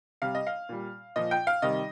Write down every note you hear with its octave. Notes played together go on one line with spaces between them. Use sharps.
C3 G3 F5
D#5
F5
A#2 G3
A#2 F3 D#5
G5
F5
C3 D#3 G3 D#5